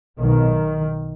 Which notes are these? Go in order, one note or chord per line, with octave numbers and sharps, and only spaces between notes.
B1 B2 D#3